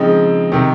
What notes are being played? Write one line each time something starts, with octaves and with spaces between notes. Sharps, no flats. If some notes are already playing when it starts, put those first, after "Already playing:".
Already playing: C#3 F3 G#3 C4 D#4
C3 D#3